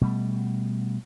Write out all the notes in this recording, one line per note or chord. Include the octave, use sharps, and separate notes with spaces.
B2 G3 A3